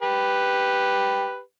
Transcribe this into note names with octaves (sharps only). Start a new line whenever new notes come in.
G4 B4